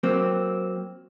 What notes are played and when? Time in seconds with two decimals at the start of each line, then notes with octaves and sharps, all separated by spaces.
0.03 F#3 A#3 C4